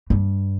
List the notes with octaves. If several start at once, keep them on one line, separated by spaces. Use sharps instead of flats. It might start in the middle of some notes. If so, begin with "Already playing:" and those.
G2